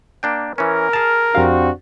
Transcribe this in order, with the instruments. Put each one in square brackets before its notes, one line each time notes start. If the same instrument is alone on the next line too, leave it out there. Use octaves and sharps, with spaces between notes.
[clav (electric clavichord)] A#3 D4 G5
[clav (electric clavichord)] E3 C#4 [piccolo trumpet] A#4
[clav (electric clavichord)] G#4 A5 [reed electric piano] F6
[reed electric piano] F2 G4 F5 [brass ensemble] C4 D4 F#4